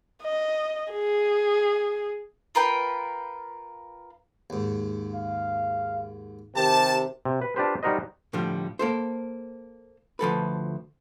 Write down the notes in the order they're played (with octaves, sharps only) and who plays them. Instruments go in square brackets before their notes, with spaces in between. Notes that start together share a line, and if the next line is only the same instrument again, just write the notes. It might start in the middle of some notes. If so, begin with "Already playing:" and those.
[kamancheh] D#5
G#4
[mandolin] F4 A#4 B4 G5
[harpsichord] D#2 G#2
[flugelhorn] F5
[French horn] C3 [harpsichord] D#3 [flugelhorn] G4 [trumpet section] A5
[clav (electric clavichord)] C3
B4
D4 F4 G4 B4 C5
G3 D#4 F#4 A#4 C5 D#5
[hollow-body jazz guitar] A2 D3 F3 G3
A#3 A4 C5
D2 F3 A4 B4